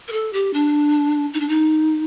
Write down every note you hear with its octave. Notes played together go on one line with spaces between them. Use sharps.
A#4
A4
G4
D4
D#4
D4
D#4